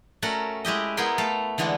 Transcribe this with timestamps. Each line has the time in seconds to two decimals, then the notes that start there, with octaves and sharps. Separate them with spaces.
0.22 A3 C#4 F#4 A4 A#4 F#5
0.65 G#3 E4 G4 D#5
0.97 B3 E4 G#4 A#4 G5 C6
1.18 A3 F5 A5
1.58 D3 E3 G#3 B3 D4